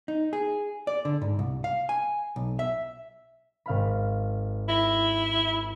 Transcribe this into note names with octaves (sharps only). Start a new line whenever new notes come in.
D#4
G#4
D5
D3
G#2
C2
F5
G#5
B1
E5
G#1 F5 B5
E4 A#6